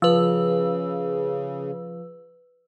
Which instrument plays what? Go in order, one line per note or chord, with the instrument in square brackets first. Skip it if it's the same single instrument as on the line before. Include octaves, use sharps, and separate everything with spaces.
[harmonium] C#3 [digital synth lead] F3 [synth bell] B4 E6